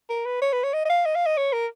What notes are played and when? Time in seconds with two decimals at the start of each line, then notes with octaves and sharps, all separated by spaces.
0.10 A#4
0.26 B4
0.42 C#5
0.53 B4
0.64 C#5
0.73 D#5
0.85 D#5
0.90 F5
1.06 D#5
1.16 F5
1.26 D#5
1.38 C#5
1.53 A#4